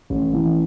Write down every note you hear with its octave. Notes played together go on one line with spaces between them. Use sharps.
A1
E3